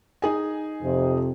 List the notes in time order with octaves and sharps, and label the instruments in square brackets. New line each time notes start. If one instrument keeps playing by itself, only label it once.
[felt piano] D#4 G#4 G#5
[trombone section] F2 C3